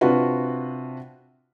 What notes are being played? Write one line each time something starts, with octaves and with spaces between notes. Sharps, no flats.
C3 D4 F4 F#4 B4